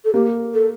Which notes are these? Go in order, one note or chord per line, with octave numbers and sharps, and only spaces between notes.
A4
A#3 G4
A4